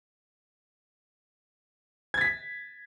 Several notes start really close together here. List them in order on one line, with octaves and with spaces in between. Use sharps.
G#6 A6 B6